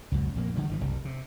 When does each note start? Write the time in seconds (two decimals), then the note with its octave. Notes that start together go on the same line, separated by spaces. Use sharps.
0.12 C#2 F#2 B2
0.35 A#1 F2 E3 A#3
0.56 D3 D#3 F3 G3
0.69 G1 E3 F3
0.81 F#1 C2 G3
1.05 C3